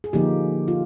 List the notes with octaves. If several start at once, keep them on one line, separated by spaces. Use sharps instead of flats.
G#4
D3 F3 A#3 D#4 G4
F4